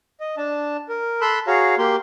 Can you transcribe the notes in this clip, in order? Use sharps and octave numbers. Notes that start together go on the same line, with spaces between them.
D#5
D4 A5
A#4
A4 B5 C6 E6 F#6
F#4 G#4 C#5 F5 A#5
A#3 G4 C6